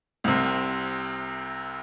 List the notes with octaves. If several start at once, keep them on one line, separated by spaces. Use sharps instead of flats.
C2 C3